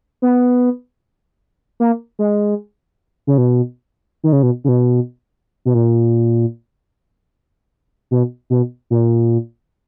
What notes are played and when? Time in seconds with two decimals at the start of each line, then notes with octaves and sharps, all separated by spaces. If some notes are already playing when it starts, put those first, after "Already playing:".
0.22 B3
1.80 A#3
2.19 G#3
3.27 C#3
3.38 B2
4.24 D#3
4.33 C#3
4.43 B2
4.64 C#3
4.68 B2
5.65 B2
5.75 A#2
8.11 B2
8.50 B2
8.90 A#2